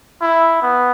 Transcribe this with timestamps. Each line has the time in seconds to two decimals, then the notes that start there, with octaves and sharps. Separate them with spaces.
0.22 E4
0.63 B3